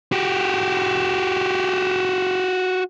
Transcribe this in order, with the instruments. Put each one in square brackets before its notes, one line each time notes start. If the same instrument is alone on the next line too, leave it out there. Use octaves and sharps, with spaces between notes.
[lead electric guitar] F#4 G4